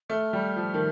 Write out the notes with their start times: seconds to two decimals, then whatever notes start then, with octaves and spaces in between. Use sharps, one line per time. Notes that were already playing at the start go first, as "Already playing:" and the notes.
0.10 A3 F6
0.33 G3
0.56 F3
0.74 D#3